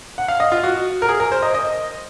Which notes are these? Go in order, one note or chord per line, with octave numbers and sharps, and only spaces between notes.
F#5
F5
D#5
F4
F#4
A#4
G#4
A#4
C5
D#5
D#5